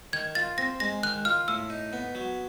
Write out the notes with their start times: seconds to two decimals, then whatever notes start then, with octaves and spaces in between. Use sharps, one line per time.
0.13 D#3 G#6
0.35 F4 A6
0.58 C4 A#6
0.80 G#3 A#6
1.03 D#3 F#6
1.25 F4 F6
1.48 A2 E6
1.70 D#4
1.93 B3
2.15 F#3